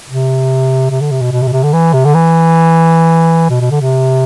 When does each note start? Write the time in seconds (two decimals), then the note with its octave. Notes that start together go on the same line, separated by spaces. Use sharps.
0.07 C3
0.90 C3
1.01 D3
1.11 C3
1.22 B2
1.32 B2
1.42 C3
1.48 B2
1.53 C3
1.63 D3
1.73 E3
1.93 C3
2.05 D3
2.15 E3
3.50 B2
3.61 B2
3.71 D3
3.81 C3